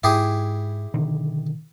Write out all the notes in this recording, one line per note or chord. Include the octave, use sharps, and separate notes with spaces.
G#2 E4 G4 G#4
B2 D3 D#3